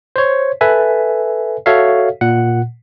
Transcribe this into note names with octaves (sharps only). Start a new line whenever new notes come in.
C5 C#5
A4 B4 E5 G#5
F#4 A4 C#5 E5 F5
A#2 F#5